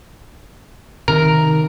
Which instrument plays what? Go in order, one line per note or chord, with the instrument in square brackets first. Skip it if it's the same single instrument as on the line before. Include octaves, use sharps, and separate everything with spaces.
[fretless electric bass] C3 D#3 [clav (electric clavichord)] A#4